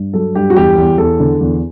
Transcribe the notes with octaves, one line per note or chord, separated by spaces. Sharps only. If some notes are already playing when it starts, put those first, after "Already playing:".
Already playing: G2
F#3 A4
G2 G4
F#4
E2 G4
E2
E2 A4
D3
E2